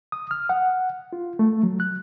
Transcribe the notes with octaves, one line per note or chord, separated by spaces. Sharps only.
D#6
F6
F#5
F4
A3
F#3
F#6